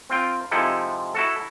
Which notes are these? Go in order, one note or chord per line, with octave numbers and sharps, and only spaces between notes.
C4 F4 G5
C3 F3 G#3 D#4 E4 A4
E4 F#4 A4